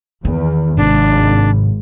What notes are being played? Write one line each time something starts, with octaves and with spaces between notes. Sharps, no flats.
E2 D#3
G#1 G#2 C3 D4